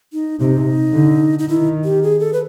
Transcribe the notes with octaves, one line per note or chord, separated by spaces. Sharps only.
D#4
C3 D#4
D3
D#4
D#3 E4
G4
G#4
A4
B4